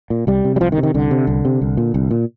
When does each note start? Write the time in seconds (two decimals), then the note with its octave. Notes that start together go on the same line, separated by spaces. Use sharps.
0.10 A#2
0.27 C2 G3
0.45 C3
0.56 G3
0.60 C2 F3
0.72 D#3
0.78 C3
0.83 D#3
0.94 C2 D3
1.11 C3
1.27 C2
1.45 C3
1.61 C2
1.77 A#2
1.94 C2
2.11 A#2